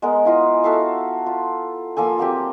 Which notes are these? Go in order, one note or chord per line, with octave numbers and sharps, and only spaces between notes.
G#3 B3 A#4
E4 F4 D#5
F#4 A4 E5 F5
F4
F3 A#3 A4 G#5
F#3 A#3 C4 G4